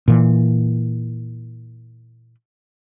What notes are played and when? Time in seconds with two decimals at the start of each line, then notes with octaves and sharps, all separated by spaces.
0.08 A#2 E3